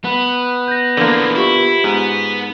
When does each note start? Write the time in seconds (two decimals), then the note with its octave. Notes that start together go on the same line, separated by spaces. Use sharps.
0.04 B3
0.68 G6 A#6
0.97 D3 E3 F3 A#3
1.36 E4 F4 G4 C#6
1.84 G#2 B3